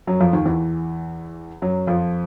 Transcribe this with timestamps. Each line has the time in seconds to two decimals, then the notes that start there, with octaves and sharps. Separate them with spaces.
0.07 F#2 F#3
0.20 F2 F3
0.33 D#2 D#3
0.46 E2 E3
1.62 F#2 F#3
1.87 F2 F3